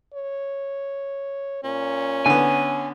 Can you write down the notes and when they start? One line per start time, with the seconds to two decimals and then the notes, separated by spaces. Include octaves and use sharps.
0.14 C#5
1.64 A#2 C#4
2.26 D3 B3 G#5